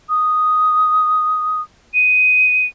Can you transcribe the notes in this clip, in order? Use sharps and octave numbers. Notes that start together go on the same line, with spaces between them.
D#6
D#7